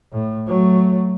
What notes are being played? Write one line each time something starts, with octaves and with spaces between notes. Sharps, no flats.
A2
F#3 A3